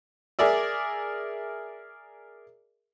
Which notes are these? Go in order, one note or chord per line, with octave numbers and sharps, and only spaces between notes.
G#4 A#4 D5 E5